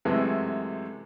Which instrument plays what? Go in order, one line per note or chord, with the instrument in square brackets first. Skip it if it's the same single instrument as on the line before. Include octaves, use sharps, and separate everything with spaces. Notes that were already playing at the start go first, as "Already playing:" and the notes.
[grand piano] F#2 C3 E3 G#3 A3